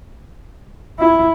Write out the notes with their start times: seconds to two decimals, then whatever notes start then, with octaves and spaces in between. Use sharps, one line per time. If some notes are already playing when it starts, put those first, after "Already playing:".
0.99 E4